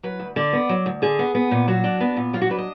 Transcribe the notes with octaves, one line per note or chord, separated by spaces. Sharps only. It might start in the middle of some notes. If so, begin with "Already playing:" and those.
F#3 B4
D2
D3 D5
B3
F#3
D2
D3 G#4
B3
B3
A#2
F#3 F#4
D4
B3
A#2
F#3 F4
F#4
D4 B4
D#5